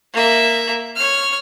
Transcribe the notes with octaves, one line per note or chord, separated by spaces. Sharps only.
A#3 E5
C#5 F6